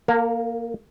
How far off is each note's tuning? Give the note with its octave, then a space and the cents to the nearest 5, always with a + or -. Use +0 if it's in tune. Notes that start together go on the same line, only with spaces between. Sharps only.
A#3 +0 A#4 -45 F5 +30